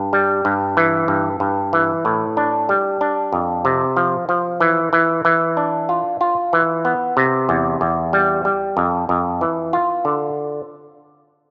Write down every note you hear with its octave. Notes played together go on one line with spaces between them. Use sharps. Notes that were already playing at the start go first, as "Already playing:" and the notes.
Already playing: G2
G3
G2
E3
G2
G2
E3
A2
D4
G3
D4
F2
C3
F3
F3
E3
E3
E3
D4
F4
F4
E3
B3
C3
E2
E2
G3
G3
F2
F2
E3
F4
D3